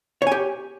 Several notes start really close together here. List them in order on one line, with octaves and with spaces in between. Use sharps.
C#5 G#5 G4